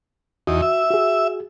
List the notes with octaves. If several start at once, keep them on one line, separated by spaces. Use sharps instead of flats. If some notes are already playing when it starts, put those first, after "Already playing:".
E2 D#4 F#4
E5
F#4 G#4